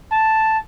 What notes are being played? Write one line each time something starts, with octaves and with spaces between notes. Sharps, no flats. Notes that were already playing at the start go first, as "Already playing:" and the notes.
A5